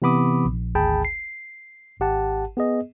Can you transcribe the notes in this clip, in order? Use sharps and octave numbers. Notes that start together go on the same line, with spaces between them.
C3 E3 B3 B5 D6 D#6
A#1
G#1 D2 G#4 G5 A5 B5
C7
G#1 G4 F#5 A5
B3 G#4 D#5